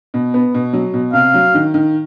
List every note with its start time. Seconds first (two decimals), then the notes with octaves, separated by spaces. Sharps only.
0.14 B2
0.34 B3
0.54 B2
0.73 F#3
0.94 B2
1.13 C3 F5
1.34 F#3
1.54 D#3
1.74 D#3